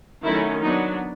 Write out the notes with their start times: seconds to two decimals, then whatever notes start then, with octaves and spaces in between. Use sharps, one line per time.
0.24 D#3 F#3 A3 C#4 E4
0.63 F#3 B3 D4 D#4